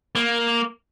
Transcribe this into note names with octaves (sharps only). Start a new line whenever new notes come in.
A#3